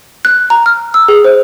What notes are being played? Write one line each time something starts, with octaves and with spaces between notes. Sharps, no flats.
F#6
A#5
F6
E6
G#4
C5